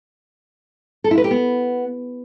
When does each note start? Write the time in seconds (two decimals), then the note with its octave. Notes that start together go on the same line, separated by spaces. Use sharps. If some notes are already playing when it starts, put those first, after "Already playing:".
1.04 A4
1.11 E4
1.18 B4
1.24 G4
1.31 B3